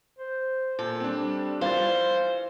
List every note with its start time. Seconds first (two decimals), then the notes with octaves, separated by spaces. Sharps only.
0.18 C5
0.79 A#2 A4
1.00 G3 C4 D4
1.61 E3 F4 C5 F5 A6